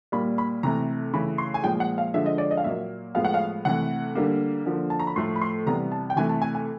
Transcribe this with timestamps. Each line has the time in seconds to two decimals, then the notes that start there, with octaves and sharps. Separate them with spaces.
0.12 A#2 G3 A#3 B5
0.38 B5
0.63 C3 E3 A3 A#5
1.13 C#3 E3 A3 B5
1.38 C6
1.54 G#5
1.64 A#2 F3 G#3 G5
1.80 F#5
1.98 F5
2.14 D3 F3 G#3 E5
2.26 D#5
2.38 D5
2.51 D#5
2.57 F5
2.64 A#2 F#3 A#3 E5
3.15 A2 F3 G#3 B3 F5
3.25 F#5
3.34 F5
3.65 C3 E3 A3 F#5
4.15 D3 G3 A#3
4.66 D3 F3 A#3
4.90 A5
4.99 A#5
5.07 B5
5.16 A2 F3 A3 C6
5.36 B5
5.41 C6
5.66 C3 E3 G3 B3 A#5
5.92 A5
6.10 G5
6.16 C3 E3 A3 G#5
6.29 A5
6.42 G#5
6.55 G#5